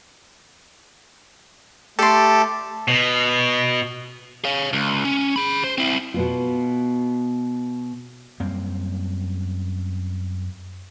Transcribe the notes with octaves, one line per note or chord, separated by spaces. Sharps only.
A3 G4 A4 D5 C6
B2
C#5 F5
C#2
C#4
G#4 B5
C5
C4 E4
B2 B3 F4
F#2 G3 A#3 C4